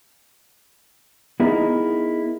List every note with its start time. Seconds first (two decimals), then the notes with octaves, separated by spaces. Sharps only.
1.40 B3 D#4 E4 G#4 A#4 D#5